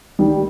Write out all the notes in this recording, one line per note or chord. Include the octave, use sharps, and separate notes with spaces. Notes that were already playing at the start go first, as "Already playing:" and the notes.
D#3 G3